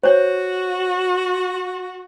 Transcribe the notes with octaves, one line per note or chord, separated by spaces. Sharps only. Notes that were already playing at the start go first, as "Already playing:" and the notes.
F#4 C5 C#5